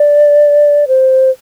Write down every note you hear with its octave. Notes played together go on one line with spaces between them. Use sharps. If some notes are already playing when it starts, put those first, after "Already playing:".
Already playing: D5
C5